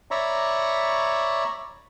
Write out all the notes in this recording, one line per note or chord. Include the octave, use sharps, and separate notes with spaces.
C#5 D5 E5 A#5 B5 C#6